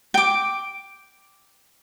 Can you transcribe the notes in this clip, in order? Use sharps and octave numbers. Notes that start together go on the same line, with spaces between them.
G5 D6